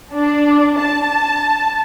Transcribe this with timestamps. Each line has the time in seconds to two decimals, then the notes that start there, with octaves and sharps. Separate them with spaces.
0.14 D4
0.80 A5